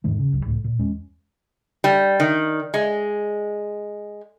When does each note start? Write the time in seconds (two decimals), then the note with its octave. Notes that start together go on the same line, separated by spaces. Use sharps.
0.04 E2 G#2 D#3 A3
0.19 C#3
0.33 F1 C#2 F#2
0.46 C#2 A2 A3
0.64 A#2
0.79 E2 G#3 C#4
1.84 G3
2.20 D#3
2.74 G#3